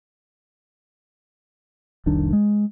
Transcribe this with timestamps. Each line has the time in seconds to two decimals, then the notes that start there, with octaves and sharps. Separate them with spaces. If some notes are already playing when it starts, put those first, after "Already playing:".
2.06 F1 C2 D#3 D4
2.33 G#3